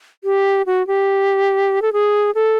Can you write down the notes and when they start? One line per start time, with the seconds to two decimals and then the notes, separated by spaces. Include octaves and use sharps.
0.24 G4
0.66 F#4
0.87 G4
1.82 A4
1.93 G#4
2.35 A4